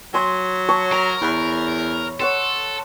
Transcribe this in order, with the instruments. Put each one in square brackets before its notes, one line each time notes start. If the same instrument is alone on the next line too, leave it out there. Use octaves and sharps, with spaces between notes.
[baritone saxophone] F#3 [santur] G#5 C6
[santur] C#5 A5 C#6
[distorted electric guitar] A#4 [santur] A#5
[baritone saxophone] E2 [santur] B5
[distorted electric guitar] A4 [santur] C#5 F#5 C6